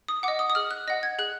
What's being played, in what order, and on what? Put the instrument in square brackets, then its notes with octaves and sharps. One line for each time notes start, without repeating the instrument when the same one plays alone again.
[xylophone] D#6
D#5 F#5 D6
D#6
D#6
G#4 F6
F#6
D#5 F#5 A#6
G#6
G#4 F#6